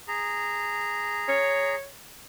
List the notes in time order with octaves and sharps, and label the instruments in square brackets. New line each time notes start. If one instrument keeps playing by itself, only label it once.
[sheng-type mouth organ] G#4 A#5
[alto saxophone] C#5